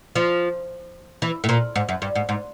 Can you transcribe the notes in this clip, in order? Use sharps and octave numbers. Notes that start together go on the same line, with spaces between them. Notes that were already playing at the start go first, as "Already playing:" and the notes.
F3
E3
A2
A#2
G#2
F#2
G2
G#2
G#2